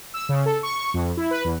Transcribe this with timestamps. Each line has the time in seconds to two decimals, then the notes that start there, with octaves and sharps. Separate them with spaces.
0.14 E6
0.29 C#3
0.46 A4
0.63 C#6
0.94 F2
1.17 E4
1.31 B4
1.45 E2